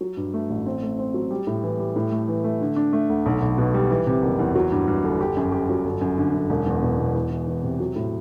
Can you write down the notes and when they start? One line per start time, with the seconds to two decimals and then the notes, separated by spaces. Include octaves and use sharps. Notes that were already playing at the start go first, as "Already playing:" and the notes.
0.01 F#3
0.17 G2
0.34 A3
0.50 A1
0.66 C4
0.83 A3
0.99 C4
1.14 F#3
1.31 G3
1.47 A2
1.64 E3
1.79 G3
1.96 A2
2.12 A3
2.28 E3
2.44 A3
2.61 D3
2.76 D4
2.93 A3
3.10 D2
3.26 B1
3.42 B1
3.58 B2
3.74 G3
3.91 E3
4.07 C3
4.23 F#1
4.39 E2
4.56 F#3
4.72 G2
4.88 G2
5.04 G1
5.21 G4
5.37 F#2
5.52 G4
5.70 F#3
5.85 G1
6.01 F#2
6.18 D3
6.34 F#2
6.50 E1
6.67 E2
6.82 B2
6.98 B2
7.15 E2
7.31 E3
7.48 E3
7.63 C3
7.80 F#3
7.96 A2